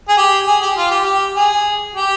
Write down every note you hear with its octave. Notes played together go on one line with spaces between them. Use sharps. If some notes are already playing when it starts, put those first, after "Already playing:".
G#4
G4
G#4
G4
F4
G4
G4
G#4
G4